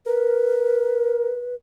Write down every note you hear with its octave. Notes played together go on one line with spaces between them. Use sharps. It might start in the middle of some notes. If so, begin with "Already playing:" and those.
A#4 B4